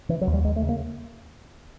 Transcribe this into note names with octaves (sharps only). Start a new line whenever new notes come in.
C#3 E3
F#3
D#2
G3
D#2 G#3
A3
C#3
A#3